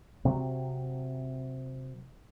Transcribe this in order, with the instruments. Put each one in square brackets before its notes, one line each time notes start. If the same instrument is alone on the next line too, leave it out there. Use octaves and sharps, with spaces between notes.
[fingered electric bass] C3 F#3 C4